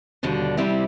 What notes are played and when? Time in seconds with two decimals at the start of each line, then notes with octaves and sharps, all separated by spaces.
0.23 D#2 B2 D3 G3 D4
0.57 C3 G3 C4 E4 G4